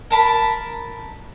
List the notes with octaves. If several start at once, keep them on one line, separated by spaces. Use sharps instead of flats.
A#4 A5 B5